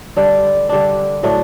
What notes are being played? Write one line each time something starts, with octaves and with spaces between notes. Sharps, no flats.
D3 G3 D4
D3 G3 D4
A2 F#3 A3 D4